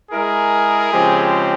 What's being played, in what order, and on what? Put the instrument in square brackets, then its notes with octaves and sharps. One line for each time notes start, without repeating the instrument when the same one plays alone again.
[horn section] G#3 E4 A#4 [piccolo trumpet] G#4
[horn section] C#3 F3 G#3 C4 G4